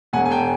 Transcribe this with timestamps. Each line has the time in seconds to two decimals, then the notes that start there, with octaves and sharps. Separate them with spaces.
0.13 E1 F#5 G#5
0.26 G#5
0.30 G5 A5